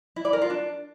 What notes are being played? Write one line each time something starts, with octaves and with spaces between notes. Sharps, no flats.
E4
D5
A#4
F4
D4